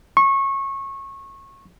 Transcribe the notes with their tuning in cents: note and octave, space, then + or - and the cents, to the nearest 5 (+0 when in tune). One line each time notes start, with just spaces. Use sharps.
C#6 -20